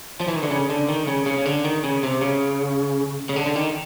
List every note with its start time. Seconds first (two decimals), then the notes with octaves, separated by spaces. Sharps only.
0.21 F3
0.28 E3
0.36 D#3
0.43 D3
0.51 C#3
0.70 D3
0.89 D#3
1.07 C#3
1.26 C#3
1.38 C#3
1.45 D3
1.65 D#3
1.84 C#3
2.03 C3
2.22 C#3
3.29 C#3
3.36 D3
3.46 D3
3.56 D#3